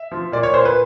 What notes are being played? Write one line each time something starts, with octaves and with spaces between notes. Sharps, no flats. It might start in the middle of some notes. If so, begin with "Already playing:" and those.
Already playing: E5
F3
A#2 D5
C#5
A#2 C5
B4